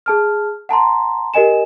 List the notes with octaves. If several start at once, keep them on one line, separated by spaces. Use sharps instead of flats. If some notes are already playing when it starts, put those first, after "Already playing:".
G#4 A5 F6
F#5 A5 A#5 C6
G4 A#4 D#5 G#5 E7